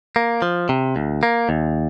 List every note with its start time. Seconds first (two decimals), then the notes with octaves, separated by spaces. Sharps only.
0.16 A#3
0.42 F3
0.69 C3
0.96 D2
1.23 A#3
1.49 D#2